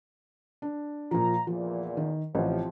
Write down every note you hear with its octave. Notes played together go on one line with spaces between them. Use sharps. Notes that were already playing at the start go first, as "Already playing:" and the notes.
D4
A#2 F3 A#5
E2 A#2 F3
D#3
A1 C3 F3